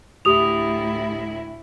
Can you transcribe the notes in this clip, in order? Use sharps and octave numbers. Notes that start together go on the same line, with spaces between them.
D2 A2 E4 G4 D#6 F7